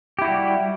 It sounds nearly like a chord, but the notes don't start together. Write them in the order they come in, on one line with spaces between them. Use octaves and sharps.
G4 E4 F#4 G3